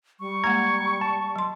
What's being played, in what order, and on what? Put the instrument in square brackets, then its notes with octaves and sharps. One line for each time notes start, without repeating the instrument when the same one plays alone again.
[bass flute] G3 [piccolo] C#6
[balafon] G#3 A#3 F#5 [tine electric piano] A#5 G#6
[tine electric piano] A5
[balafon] F#3 C6